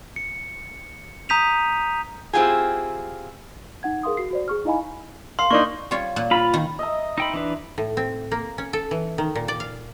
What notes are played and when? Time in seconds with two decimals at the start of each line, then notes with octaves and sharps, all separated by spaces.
0.16 C#7
1.29 A#5 D#6 G6 B6 D#7 F7
2.33 C4 E4 F4 G4 G#4
3.83 D#4 F#5 G#6
4.03 G#4 A#4 F5 C6 D#6
4.17 F#4 C7
4.31 F#4 C5 D5
4.48 G#4 C#6 F6
4.65 D#4 E4 D#5 F5 G#5 B5
5.39 F5 C6
5.51 A#3 D4 D#4 C#6
5.91 G3 F4 C#5
6.16 A#2
6.31 F4 B5
6.54 D#3
6.79 D#5 E5 A#5
7.18 D#4 E5 G5 B5 C6
7.33 E3 D4 B4
7.78 A2
7.97 C4
8.31 A#3
8.58 C#4
8.73 A4
8.91 E3
9.18 D#3
9.35 A#2
9.48 D5
9.60 F5